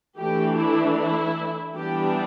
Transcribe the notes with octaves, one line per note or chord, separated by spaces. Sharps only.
E3 A3 D4 G4
E4
E4
E3 G3 B3 D4 G4